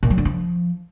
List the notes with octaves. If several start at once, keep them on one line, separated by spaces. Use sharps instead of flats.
A#2
F#3
D3
F3